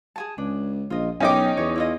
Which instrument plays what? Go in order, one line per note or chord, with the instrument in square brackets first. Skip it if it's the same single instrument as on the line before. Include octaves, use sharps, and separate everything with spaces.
[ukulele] G#4 G#5 A5
[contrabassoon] C#2 [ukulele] D4
[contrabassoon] A#1 [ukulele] F4 D#5
[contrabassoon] B1 [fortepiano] C#4 D#4 D6 [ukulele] A#4 G5
[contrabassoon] E2 [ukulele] C#5
[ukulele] E4 F4 D#5